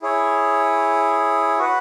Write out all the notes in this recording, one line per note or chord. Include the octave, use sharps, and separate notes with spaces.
E4 G#4 C#5
F#4 B4 F#5